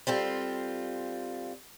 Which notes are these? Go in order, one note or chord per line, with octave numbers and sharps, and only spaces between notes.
G3 C4 F4 A4